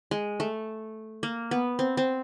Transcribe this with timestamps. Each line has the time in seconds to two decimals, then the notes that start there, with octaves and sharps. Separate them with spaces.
0.11 G#3
0.40 A3
1.23 A#3
1.51 B3
1.79 C4
1.97 C4